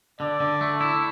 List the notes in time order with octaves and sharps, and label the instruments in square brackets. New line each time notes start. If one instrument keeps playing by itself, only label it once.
[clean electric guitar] D3 [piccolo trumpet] D5
[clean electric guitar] D3
A3
E4